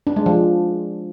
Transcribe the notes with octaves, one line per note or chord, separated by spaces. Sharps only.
D4
G#3
F3